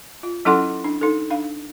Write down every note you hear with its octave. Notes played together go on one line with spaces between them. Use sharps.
F4
F#3 C#4 E4 A4 F#5 C6
D4
D#4 A4
D4 F5